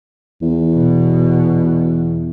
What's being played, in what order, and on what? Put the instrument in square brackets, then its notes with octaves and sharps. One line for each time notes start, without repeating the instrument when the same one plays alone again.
[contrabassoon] E2
[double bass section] B2